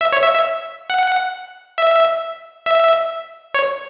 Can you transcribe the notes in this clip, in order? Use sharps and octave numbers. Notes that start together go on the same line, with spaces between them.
E5
C#5
E5
E5
F#5
E5
E5
C#5